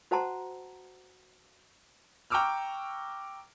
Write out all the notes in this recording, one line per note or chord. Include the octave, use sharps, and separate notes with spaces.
F#4 C5 F#5 A5 A#5 C6
G5 A#5 C#6 D6 E6 F6